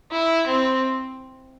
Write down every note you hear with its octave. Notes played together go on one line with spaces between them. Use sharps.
E4
C4